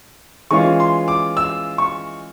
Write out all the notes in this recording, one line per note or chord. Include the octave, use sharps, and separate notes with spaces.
E3 G#3 C#4 F4 C#6
C6
D6
E6
C#6